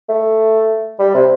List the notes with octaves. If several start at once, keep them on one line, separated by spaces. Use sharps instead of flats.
A3
G3
C3